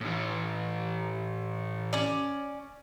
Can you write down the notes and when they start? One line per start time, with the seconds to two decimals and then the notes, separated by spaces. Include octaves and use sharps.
0.01 A2 E3
1.93 C#4 D5